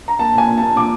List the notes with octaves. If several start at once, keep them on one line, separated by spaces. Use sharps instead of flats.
A#5
A#3 A5
A#2 G#5
A#2
A#3 A5
A#2 D6